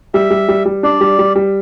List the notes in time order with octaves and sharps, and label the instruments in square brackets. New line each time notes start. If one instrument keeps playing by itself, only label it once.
[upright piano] G3 [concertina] E5
[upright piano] G3
G3
G3
[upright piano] D4 [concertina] D5
[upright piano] G3
G3
G3